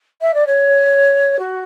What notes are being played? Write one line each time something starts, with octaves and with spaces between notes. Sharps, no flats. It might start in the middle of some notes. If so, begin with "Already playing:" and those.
E5
D5
C#5
F#4